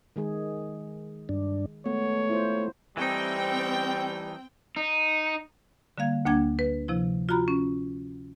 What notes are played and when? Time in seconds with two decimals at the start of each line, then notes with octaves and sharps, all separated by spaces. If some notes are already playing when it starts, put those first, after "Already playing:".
0.16 D#3 G#3 G#4
1.29 G2 D4
1.86 G#3 A3 B3 C#5
2.29 E4 F4 C5
2.97 E3 G3 A3 C4 D#4 G5
4.76 D#4
5.98 D3 G3 A#3 F5 G#6
6.25 D2 A#3 D4 G5 G#6
6.59 B4
6.88 C3 F3 E4
7.29 F4 F#4 A#5 B5
7.48 C#4